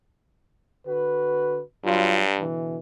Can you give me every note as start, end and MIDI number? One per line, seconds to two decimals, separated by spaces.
0.86 1.61 50
0.86 1.61 66
0.86 1.61 71
1.84 2.43 43
1.84 2.23 54
1.84 2.23 65
2.40 2.77 47
2.40 2.77 50
2.40 2.77 52